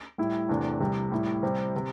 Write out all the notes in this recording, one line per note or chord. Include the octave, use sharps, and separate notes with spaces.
A2 G3 E4
E2 C3 A3 D4
C2 C3 G3
A2 G3 E4
C3 G3 C4
C3